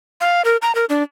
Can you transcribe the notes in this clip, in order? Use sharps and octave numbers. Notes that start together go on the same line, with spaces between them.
F5
A#4
A#5
A#4
D4